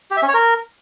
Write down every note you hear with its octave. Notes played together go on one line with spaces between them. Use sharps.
G4
E5
C#4
C#5
A#4